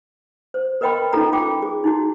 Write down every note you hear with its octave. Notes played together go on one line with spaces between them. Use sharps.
C5
A#4 B4 D#5 G5 B5 C6
C#4 D#4 F4 A4 A#5
F4 G5 D6
G#4
D#4 E4 F#4